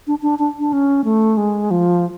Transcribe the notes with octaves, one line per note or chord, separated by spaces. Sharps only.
D4
D4
D4
D4
C#4
A3
G#3
F3